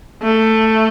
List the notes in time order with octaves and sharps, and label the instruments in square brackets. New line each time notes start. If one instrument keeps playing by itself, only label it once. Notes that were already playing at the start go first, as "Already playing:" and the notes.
[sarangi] A3